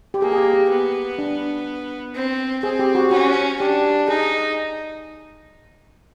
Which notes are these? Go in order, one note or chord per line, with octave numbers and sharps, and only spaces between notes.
G4
A#3 G#4
G#4
G4
G4
B3
D4
C4
C4 G#4
G4
F#4
C#4 F#4
D4 G4
D#4 G#4